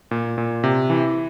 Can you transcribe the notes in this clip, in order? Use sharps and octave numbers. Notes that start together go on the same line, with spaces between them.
A#2
A#2
C3
E3